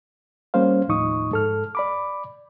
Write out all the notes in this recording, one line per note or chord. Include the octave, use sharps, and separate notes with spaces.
G3 A#3 C#4 C5 F5
D#2 A2 F3 D#4 C#6 D#6
G#2 A4 F6
D5 B5 D6